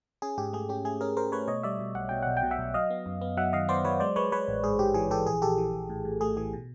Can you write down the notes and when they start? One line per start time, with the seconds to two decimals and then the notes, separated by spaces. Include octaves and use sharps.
0.22 C#4 G#4
0.38 G#2 G4
0.53 A3 G#4
0.69 C#4 G4
0.85 A3 G#4
1.01 C#4 G#4 A#4
1.16 C#4 A#4 C5
1.32 A3 B4 C#5
1.48 B2 C#5 D#5
1.63 G3 D5 E5
1.79 B2
1.95 B1 F#5
2.09 B2 G5
2.23 B1 F#5
2.37 G5
2.43 B2
2.51 E5 F#5
2.58 B1
2.74 F#3 D#5 F5
2.90 B3
3.06 F#2
3.22 B3
3.37 F#3 E5 F#5
3.53 D#3 D#5 F5
3.69 B3 C5 D5
3.84 F#3 B4 C#5
4.00 G#3 C5 D5
4.16 G#3 B4 C#5
4.32 G#3 B4 C#5
4.48 A1
4.64 G#2 G#4
4.79 G#2 G4
4.94 E3 G#4
5.11 E3 G4 A4
5.27 A#1 G#4
5.42 A#1 G4 A4
5.58 E3
5.74 A#1
5.90 A2
6.05 A2
6.21 A3 G#4
6.37 E3 G#4
6.53 B2